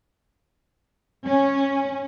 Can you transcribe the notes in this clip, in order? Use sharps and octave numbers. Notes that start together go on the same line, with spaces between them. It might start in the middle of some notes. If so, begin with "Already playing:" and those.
C#4